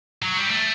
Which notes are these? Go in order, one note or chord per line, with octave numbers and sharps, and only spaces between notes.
F#3
G3
A3